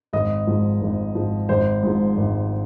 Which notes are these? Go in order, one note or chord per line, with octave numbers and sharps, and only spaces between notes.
G#1 D#5
G#2 F3
G#1
G#2 F3
G#1 C5
G#2 F3
G#1